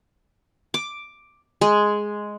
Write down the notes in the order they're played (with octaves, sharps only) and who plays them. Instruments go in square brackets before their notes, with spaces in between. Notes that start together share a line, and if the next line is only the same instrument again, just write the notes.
[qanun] D6
G#3